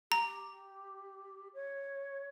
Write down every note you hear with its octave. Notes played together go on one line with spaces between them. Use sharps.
G4 A#5
C#5